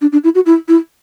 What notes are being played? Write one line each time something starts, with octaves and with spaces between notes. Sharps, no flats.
D4
D4
E4
F#4
E4
E4